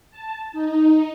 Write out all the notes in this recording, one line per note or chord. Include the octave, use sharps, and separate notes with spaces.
A5
D#4